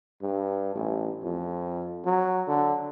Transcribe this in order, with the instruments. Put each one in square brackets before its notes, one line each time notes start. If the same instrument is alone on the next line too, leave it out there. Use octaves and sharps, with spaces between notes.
[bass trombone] G2
A1
F2
F#3
D3